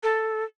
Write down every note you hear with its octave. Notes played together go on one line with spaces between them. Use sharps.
A4